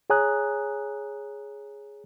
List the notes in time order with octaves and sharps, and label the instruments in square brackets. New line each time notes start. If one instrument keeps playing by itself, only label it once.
[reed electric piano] G#4 C#5 G#5 A#5 D#6 F#6